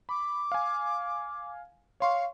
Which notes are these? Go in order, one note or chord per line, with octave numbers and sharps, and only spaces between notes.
B5 D6
F5 G#5
C#5 F5 C6 C#6